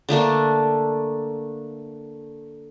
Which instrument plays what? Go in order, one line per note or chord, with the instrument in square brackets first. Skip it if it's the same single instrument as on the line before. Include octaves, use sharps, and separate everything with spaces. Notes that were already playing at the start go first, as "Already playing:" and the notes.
[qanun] D3 A3 A#3 D4